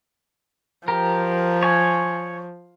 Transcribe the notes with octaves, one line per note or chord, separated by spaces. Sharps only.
F3 G4 A#4
C#5 G#5